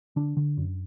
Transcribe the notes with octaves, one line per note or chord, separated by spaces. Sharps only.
D3 D4
D3
F#2